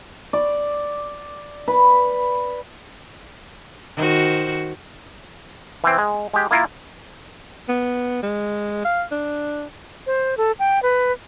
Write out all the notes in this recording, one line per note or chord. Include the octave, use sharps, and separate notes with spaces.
D5
B4
D#3 F#4 C5
E3 C4
G#3
G#3 G4
A#3 E4 F4 A#4
B3
G#3
F5
D4
C5
A4
G5
B4